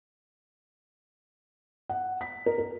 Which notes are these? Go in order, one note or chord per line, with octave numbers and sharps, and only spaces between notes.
F#5
B6
A#4
A#4